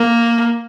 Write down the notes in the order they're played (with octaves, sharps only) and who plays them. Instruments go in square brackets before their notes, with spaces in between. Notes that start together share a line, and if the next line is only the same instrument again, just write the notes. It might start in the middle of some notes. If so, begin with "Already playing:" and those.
Already playing: [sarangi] A#3